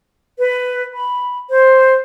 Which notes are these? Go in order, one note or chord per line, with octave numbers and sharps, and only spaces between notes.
B4
B5
C5